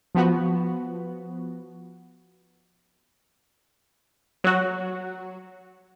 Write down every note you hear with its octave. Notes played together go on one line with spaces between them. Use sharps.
F3 B3 F#4
F#3 F#4